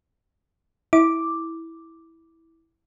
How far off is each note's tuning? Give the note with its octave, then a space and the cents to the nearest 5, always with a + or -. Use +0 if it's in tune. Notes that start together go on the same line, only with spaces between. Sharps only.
E4 -10 D6 +0